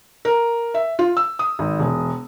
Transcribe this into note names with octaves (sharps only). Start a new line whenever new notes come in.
A#4
E5
F4
E6
D#6
G#1
E1